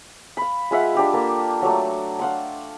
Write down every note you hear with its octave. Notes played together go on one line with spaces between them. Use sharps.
F5 B5
G#3 F4 E5 F#5
D4 G4 F5
A#3 A4
F#3 A3
F5 F#5 C6